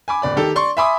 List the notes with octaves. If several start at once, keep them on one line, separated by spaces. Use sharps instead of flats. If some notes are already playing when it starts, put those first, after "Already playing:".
G#5 B5 D6
D1 D5 B5
D#3 G4 A4
D5 C6 C#6
E5 G#5 B5 C6 D6 D#6